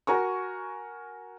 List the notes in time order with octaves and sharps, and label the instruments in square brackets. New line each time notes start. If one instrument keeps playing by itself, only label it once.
[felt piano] F#4 A#4 G#5 C#6